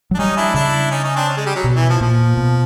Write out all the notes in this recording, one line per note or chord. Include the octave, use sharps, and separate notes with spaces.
F#3
D4
G3 C#4 D#4
D4 E4
C#3 D4 E4
C#4 D#4
C#4 D#4
C4 D4
C#4
G#3
G3
F#3
B2
E3
F3
A#2 F3
B2